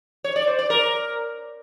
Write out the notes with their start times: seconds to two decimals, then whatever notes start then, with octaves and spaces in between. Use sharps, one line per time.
0.24 C#5
0.36 D5
0.47 C5
0.59 D5
0.70 A#4